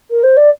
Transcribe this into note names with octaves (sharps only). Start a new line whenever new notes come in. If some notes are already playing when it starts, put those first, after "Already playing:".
A#4
C5
D5